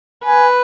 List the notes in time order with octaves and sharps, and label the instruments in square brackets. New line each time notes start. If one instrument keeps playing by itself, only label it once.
[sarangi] B4 [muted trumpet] G#5